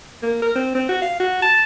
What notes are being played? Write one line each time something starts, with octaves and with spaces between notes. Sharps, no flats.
A#3
A#4
C4
C4
F#4
F5
F#4
A5